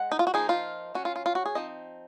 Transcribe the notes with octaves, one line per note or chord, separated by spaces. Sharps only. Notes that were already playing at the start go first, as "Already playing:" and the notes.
Already playing: G#3 F#5
D#4
F4
F#4
F3 A#3 D#4 G#4
F4
F#3 C#4 F#4
F4
F4
F4
F#4
G#4
F3 C4 D#4 D#5